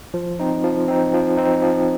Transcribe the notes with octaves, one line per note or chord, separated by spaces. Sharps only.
F3
C4 D#4
F3
C4 D#4
F3
C4 D#4
F3